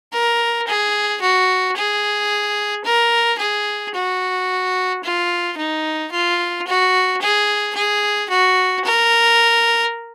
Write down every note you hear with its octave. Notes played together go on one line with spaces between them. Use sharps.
A#4
G#4
F#4
G#4
A#4
G#4
F#4
F4
D#4
F4
F#4
G#4
G#4
F#4
A#4